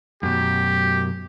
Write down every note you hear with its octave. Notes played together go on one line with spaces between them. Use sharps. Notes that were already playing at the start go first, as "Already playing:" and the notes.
F#2 B2 G4